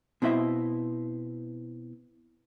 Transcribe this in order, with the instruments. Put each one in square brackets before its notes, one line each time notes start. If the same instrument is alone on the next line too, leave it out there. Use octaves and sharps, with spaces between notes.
[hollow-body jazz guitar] B2 C4 E4 D#5 E5